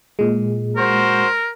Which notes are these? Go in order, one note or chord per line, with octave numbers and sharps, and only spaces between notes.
A#2 G#3
F#4 A#4 C5